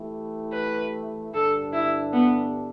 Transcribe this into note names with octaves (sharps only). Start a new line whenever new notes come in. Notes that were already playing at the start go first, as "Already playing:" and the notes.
Already playing: E3 A3 E4 G4
B4
G2 D3 G3 D4 A4
E4
B3